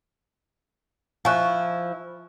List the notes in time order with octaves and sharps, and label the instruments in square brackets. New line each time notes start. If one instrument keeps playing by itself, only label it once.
[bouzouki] F3 E4 [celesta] G#5 C#6 F#6